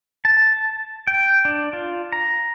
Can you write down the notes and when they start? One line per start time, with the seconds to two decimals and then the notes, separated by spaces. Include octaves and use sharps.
0.25 A5
1.07 G5
1.45 D4
1.73 F4
2.12 A#5